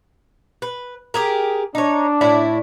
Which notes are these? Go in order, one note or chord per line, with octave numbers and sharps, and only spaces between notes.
B4
G4 G#4 A#4
D4 D#4 C#5
A2 E4 D5